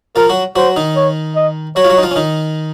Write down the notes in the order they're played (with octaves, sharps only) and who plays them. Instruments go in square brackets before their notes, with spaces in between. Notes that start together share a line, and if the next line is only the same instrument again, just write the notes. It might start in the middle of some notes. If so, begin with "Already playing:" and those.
[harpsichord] F3 F4 [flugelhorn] A#4
[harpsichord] F#3 F#4
[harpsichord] F#3 F#4 [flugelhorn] C5
[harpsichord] D#3 D#4
[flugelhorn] C#5
D#5
[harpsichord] F#3 F#4 [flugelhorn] C#5
[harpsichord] F4
F#3 F#4
D#4
F3 F4
C#4
D#3 D#4